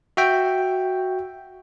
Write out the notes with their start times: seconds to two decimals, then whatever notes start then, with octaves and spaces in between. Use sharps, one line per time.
0.17 F#4 E5 G5